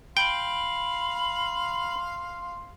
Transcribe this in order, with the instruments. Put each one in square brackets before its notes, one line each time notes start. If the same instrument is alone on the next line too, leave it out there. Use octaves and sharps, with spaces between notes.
[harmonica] F5 C6 [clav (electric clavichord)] G5 [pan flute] B5